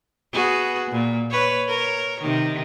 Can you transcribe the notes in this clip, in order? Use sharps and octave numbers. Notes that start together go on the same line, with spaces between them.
B3 F#4 G#4
A#2
B4 C#5
A#4 C#5
C3 D#3